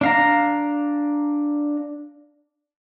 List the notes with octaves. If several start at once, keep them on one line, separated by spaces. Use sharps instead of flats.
D4 F5 A#5